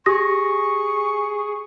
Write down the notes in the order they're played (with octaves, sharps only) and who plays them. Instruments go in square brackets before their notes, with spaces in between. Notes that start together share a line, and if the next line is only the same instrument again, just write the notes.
[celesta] G4 D#6 A#6 [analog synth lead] G#4 [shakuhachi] C#6